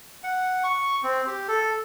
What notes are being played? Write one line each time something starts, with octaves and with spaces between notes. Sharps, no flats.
F#5
C#6
C4
G4
A4